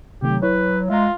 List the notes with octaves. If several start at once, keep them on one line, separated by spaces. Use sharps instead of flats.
C3 D#3 F#3 A3 G4
E4 B4 C#5
G#3 F4 E5 A#5